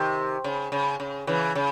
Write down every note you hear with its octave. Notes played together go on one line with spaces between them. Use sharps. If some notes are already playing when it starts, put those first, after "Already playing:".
Already playing: C3 D#3
C#3
C#3
C#3
C#3 E3
C#3